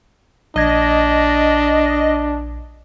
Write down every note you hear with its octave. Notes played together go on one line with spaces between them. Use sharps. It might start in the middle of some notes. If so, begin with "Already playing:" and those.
A#1 D4 D#5 G#6